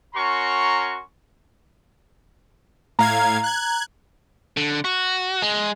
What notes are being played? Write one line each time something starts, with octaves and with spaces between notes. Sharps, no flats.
C#4 F#4 A#4 A#5 C6 C#6
A2 F5 A#5 G#6
F#6 G#6
D3
F#4
G#3